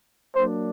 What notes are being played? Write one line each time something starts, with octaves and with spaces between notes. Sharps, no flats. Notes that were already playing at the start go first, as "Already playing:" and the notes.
F#3 A#3 D4 C5